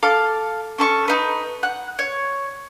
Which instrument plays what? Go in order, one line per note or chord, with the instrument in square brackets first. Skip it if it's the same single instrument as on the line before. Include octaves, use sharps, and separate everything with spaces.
[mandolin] A4 F5 D6
C#4 A4 C#6
D#4 B4
F#5 F#6
C#5